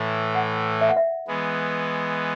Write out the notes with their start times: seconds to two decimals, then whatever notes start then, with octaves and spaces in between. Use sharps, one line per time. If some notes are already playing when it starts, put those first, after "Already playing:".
Already playing: A2 E3 A3
0.35 F#5
0.81 E5
0.89 F#5
0.97 E5
1.28 E3 G#3 B3